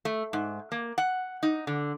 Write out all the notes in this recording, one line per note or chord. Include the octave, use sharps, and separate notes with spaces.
A3
G#2
A#3
F#5
D#4
D3